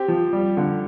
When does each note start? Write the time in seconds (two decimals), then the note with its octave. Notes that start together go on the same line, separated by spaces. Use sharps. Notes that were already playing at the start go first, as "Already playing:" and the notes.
Already playing: C4 G4
0.08 F3
0.33 G3
0.57 D3